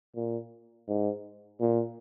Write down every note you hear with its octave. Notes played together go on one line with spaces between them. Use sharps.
A#2
G#2
A#2